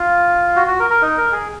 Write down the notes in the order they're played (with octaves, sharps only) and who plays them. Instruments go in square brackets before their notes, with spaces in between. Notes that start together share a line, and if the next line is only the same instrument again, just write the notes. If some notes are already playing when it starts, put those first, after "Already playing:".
Already playing: [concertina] F4
F#4
F#4
A#4
A#4
D#4
A#4
G#4